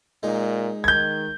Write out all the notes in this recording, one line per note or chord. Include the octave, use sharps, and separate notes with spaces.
A#2 G#3 D#4
D#3 G6 G#6